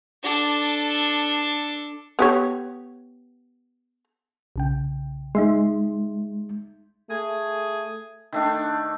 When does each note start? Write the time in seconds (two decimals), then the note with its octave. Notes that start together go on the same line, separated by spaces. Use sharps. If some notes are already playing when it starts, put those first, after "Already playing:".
0.23 D4 A4
2.19 B3 G4 C#5
4.56 B1 C#3 G5
5.35 G#3 D#4 E5 C6
7.10 A3 G#4
8.33 D#3 A3 D4